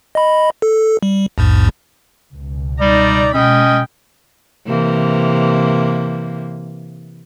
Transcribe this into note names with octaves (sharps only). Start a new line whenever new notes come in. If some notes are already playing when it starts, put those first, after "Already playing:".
D#5 B5
A4
G3
A#1 E2 G#2
C#2 B2
G3 D#4 D5 A#5
B2 G#3 C#4 D#5 G5 B5
C3 E3 A#3